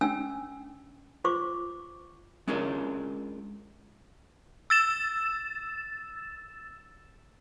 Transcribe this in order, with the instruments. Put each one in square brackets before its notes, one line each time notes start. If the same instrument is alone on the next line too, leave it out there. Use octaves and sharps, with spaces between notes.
[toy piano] C#4 D4 G5 G#5 E6
F4 C5 C#6 D6
[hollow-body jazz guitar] G#3 C#4 D4 F4 G#4 A#4
[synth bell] E6 A6 E7